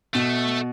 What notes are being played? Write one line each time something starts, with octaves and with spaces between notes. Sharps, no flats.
B2 A3